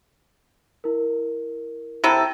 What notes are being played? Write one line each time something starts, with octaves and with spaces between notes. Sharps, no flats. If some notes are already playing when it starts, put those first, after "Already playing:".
E4 A#4
C3 E4 A4 G5 A#5 D#7